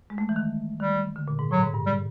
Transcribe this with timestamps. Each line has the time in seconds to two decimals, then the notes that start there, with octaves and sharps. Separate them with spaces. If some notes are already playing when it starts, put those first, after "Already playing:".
0.10 G#3
0.18 A3
0.29 E3
0.36 D#3
0.80 D#3 G3
1.16 D3
1.28 A#2
1.39 G#2
1.51 A2 F#3
1.63 G#2
1.74 G2
1.86 G3